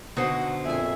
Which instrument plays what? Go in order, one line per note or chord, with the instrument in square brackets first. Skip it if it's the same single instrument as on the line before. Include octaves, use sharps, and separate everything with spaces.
[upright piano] B2 [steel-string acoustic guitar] D3 C5 [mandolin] D#4 F#4
[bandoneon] F2 A#2 E5 [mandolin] G#4 G#5